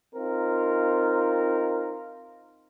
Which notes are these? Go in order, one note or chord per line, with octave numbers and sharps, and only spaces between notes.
C4 D#4 F4 A#4